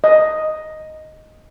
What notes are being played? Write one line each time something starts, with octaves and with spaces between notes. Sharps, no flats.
D#5